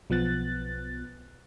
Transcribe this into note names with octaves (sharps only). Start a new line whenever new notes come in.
B1 F3 B3 F#6 A6